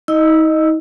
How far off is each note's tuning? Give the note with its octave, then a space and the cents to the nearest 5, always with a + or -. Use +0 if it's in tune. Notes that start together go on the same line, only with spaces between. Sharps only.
D#4 +40 D#5 -10 E6 +0